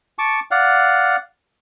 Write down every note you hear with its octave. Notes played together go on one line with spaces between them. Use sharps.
A5 C#6 D6
D5 F5 F#5